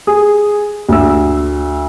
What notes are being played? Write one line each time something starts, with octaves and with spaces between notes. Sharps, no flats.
G#4
D2 E6